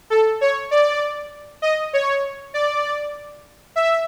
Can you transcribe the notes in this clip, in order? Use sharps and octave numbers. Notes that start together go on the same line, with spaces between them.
A4
C#5
D5
D#5
C#5
D5
E5